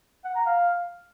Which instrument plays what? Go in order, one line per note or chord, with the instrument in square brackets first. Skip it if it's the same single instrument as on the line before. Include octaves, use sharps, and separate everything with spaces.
[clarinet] F#5
A#5
F5